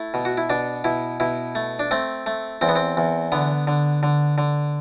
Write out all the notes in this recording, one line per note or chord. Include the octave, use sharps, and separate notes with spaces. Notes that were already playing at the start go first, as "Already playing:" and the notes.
Already playing: A3 E4
B2
F#4
E4
B2 D4
B2 E4
B2 E4
A3
D4
A3 C4
A3
E2 C4
B3
C4
E2
D3 B3
D3
D3
D3